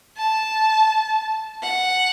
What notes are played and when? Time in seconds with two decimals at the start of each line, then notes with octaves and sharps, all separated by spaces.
0.17 A5
1.63 F#5